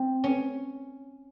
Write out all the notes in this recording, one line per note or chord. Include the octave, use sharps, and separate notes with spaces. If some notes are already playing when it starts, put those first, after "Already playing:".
Already playing: C4
C#4